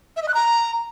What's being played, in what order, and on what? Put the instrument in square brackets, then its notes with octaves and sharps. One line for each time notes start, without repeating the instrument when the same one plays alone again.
[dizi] E5
D#5
F#6
A#5